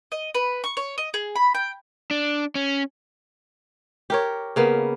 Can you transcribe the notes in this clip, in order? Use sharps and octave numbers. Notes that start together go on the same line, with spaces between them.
D#5
B4
C#6
C#5
D#5
G#4
B5
G5
D4
C#4
G4 A#4 C#5
C#3 A#3 B3